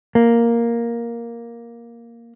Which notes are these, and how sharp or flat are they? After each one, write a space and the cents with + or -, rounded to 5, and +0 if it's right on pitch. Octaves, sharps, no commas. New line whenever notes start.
A#3 +5